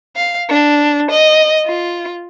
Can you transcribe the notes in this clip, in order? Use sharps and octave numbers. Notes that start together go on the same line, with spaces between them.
F5
D4
D#5
F4